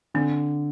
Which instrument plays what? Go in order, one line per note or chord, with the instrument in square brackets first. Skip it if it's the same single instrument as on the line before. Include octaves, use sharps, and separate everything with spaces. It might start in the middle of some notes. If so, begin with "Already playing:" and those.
[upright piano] D3 [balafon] C4